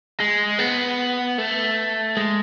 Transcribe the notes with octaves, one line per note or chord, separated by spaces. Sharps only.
G#3
B3
A3
G#3